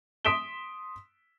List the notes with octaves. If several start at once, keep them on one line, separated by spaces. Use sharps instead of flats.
C6 D#6 B6 D7 E7 G7